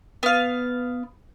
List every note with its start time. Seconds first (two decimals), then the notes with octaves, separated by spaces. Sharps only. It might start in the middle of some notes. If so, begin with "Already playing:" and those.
0.23 B3 F5